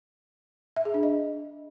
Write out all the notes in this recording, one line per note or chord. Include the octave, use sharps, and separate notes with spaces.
E5
G#4
D4
D#5